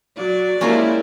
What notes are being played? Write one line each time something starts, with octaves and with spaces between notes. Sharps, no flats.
F#3 D5
G#3 A#3 C#4 E4 F4 G4 A#4